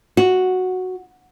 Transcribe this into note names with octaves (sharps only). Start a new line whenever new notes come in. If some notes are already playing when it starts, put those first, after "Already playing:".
F#4